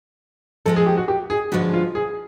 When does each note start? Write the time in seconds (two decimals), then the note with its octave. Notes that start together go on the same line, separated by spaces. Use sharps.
0.66 F3 G#3 C4 A4
0.76 G#4
0.86 G4
0.97 F#4
1.08 G4
1.30 G#4
1.52 G2 D3 F3 G#3 F#4
1.73 F4
1.95 G#4